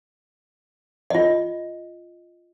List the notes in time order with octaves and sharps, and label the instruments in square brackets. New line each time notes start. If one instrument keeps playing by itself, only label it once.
[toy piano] F4 D#5